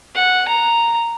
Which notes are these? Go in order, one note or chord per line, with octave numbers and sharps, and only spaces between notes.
F#5
A#5